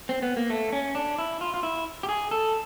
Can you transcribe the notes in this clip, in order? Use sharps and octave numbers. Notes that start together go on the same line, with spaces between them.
C4
B3
A#3
A3
C#4
D4
E4
F4
F4
E4
G4
G#4
A4